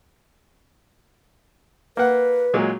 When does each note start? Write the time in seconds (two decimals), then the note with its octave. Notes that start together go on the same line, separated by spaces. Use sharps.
1.97 A#3 B4 F#5
2.54 A#2 F#3 G#3